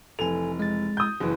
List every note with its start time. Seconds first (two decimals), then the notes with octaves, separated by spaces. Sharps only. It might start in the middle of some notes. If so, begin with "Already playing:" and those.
0.19 F1 E3 A4 G#5 F7
0.59 G#3 A6
0.97 D#6 G6
1.20 F#1 E3